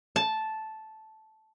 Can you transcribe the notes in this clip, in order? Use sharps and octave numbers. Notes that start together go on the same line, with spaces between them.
A5